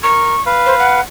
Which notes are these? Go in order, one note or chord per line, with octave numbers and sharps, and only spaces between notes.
A#4 C#6
B4 F5
C5
F#5